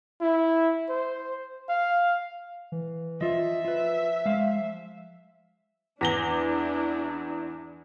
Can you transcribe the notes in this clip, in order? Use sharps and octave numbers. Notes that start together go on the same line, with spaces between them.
E4
C5
F5
E3
F3 F4 D#5 E5
F4 B4
G#3 F5
E2 D4 E4 A#6 G7